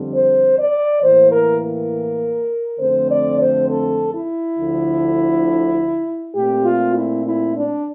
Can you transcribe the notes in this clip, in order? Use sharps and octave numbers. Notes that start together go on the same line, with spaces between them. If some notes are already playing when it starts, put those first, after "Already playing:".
Already playing: F2 D3 G3 C4
C5
D5
A2 E3 A#3 C5
A#4
A#4
F2 D3 A3 C4 C5
D5
C5
A4
E4
D2 D3 F3
A#2 A3 C4 G4
F4
E4
E4
D4